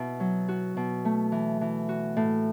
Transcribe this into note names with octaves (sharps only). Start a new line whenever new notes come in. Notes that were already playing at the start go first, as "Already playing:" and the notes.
Already playing: B2 E4
F#3
F#4
B2
A3
E3
E3
F#4
A2